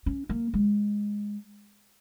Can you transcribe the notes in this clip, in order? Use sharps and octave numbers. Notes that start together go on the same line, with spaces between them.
C#4
A#3
G#3